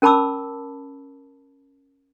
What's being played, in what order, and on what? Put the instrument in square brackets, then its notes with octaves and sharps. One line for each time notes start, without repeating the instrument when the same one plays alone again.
[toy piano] C#4 A#4 A5 B5 D6 E6